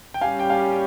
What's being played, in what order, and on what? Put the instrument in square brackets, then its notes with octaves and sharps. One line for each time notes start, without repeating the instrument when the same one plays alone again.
[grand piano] G5
[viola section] G3 C#4 G4 [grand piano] F5 G#5
[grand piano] G5
F5 G#5